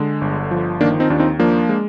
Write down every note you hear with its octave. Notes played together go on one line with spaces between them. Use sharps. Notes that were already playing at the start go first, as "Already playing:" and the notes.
Already playing: D3 G#3
G1
F3
D#3 A#3 D4
C4 D#4
D#2 D4
C4 D#4
F3 A#3 D4
G#3